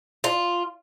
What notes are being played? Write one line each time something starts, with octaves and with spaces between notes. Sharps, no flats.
F4